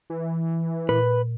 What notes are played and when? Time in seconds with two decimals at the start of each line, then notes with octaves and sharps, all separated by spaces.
0.10 E3
0.89 A#2 B4